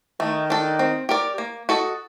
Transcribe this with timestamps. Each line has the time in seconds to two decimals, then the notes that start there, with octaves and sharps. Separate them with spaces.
0.20 D#3 A3
0.50 D4 A4
0.79 C4
1.09 G4 A#4 D5
1.38 A#3
1.69 F#4 A4 D#5